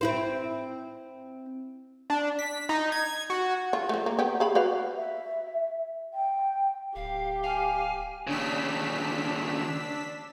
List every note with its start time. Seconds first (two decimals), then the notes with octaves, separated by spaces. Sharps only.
0.01 C4 E4 C5
2.10 D4
2.39 B6
2.69 D#4
2.92 G#6
3.30 F#4
3.73 F4
3.89 F3 A3
4.06 A#3
4.19 B3 G4
4.40 G#4 F5 B5
4.55 F#4 B4 F5
4.96 E5
6.13 G5
6.96 D1 G4 F5
7.44 F5 G#5
8.27 D#2 C#3 D4 E6 B6